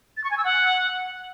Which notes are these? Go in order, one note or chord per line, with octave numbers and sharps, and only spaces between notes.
A6
C#6
G#5
E6
F#5